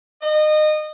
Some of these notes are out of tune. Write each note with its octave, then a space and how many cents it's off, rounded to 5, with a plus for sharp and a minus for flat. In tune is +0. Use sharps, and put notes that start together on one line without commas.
D#5 -25